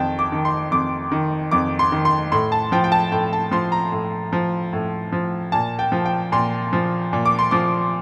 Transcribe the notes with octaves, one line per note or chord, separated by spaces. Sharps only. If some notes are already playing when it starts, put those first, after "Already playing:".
Already playing: F2 D#3 G5 A5
D6
D#3
C6
F2 D6
D#3
F2 D6
C6
D#3
C6
A2 C6
A5
F3 G5
G5
A5
A2 G5
A5
F3 C6
A#5
A2
F3
A2
F3
A#2 A5
G5
F3
G5
A#2 C6
F3
A#2
D6
C6
F3 D6